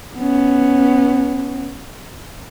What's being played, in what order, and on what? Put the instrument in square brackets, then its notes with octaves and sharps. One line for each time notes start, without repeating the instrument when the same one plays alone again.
[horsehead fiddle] B3 C#4